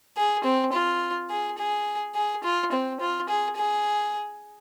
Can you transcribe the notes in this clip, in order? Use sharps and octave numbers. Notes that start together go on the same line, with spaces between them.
G#4
C4
F4
G#4
G#4
G#4
F4
C4
F4
G#4
G#4